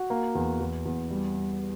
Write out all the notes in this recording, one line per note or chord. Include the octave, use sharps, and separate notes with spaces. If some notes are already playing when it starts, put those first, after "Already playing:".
Already playing: F#4
A#3
E2
E2
E2
G3
G3